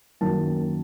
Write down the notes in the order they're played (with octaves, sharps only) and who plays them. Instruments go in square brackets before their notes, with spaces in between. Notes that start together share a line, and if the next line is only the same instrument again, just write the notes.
[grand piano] F#2 D#3 F#3 A#3 A5